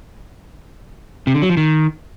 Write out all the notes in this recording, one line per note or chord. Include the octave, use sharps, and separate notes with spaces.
C3
D3
F#3
F3
D#3